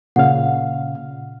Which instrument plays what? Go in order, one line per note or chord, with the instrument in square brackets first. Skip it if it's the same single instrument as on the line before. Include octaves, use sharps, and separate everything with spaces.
[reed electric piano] A#2 C#3 F5 [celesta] F#5